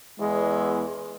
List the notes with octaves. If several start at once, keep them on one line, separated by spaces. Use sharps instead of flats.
E2 G#3